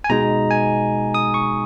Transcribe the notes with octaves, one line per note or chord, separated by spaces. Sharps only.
G#5
B2 G#3 D#4 A#5
G#5
D#6
C#6